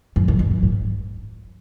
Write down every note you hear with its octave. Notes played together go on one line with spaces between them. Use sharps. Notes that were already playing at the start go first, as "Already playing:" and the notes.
F#2
F2
F#2
F#2
G#2